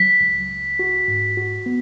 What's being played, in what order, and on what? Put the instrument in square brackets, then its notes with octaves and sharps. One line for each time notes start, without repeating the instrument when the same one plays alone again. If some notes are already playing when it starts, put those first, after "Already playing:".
Already playing: [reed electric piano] F#3 [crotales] B6
[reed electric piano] C#2
C#2
F#4
G#2
F#4
B3